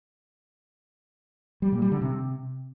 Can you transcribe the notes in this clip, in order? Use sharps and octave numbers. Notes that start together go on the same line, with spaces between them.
G3
A#2
G3
D3
C3